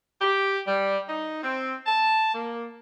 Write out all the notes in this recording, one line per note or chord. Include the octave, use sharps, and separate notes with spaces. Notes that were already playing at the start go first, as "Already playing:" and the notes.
G4
G3
D#4
C4
A5
A#3